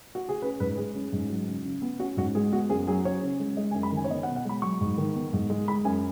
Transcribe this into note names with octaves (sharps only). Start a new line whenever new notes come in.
F#4
G#4
C#4 B4
G#2 B4
B4
G#3 G#4
C#4
G#2
F#3
C#3
C#3
B3
C#4 F#4
G#2 F#4
G#3 G#4
B3 F#4
F#2 G#4
F#3 G#4
C#4 C#5
C#3
G#3
G#3 D#5
G#5
F#2
B5
D#3 G#5
C#5
B3 D#5
F#5
B2
F#5
G#3 B5
F#3 C#6
G#2
D#3
B3
G#2
G#3
G#3 B5
F#2 G#5